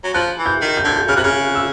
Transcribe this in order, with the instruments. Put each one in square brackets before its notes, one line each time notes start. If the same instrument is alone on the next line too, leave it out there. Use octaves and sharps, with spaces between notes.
[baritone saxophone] F#3
[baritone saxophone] F3 [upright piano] F#6
[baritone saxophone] E3
[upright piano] G6
[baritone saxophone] D#3
[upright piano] G6
[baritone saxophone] D3 [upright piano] G#6
[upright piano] G6
[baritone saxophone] C#3 [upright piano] F6
[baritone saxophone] C3 [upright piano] F#6
[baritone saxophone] C#3 [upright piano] F6
[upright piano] E6